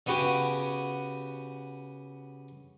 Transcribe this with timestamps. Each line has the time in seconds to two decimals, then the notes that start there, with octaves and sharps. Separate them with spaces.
0.06 C#3 B3 F#4 G4 G#5